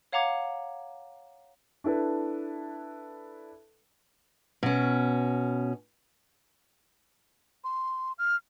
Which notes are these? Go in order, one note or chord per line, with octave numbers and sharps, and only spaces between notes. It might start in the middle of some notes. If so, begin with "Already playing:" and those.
C#5 F5 F#5 A#5 D6 G#6
D4 E4 A4 B4
B2 C#4
C6
F6